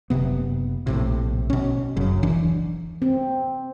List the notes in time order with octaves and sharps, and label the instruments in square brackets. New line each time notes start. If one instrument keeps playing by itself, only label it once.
[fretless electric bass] F#1 C#2 C3 B3
A#1 A2 C3
B2 C#4
F#1 F#2 C#3
D1 E3 D4
[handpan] C4